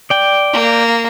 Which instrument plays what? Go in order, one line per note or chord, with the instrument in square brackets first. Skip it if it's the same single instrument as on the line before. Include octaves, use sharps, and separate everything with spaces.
[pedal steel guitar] D5 G5
[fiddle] A#3